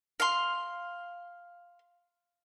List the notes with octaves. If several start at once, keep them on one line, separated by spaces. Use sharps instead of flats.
F5 C6